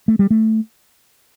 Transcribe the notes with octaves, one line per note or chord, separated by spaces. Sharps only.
A3
G3
A3